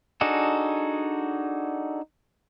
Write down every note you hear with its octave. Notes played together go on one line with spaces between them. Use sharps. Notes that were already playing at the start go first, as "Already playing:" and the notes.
D4 D#4 F#4 G#4 A4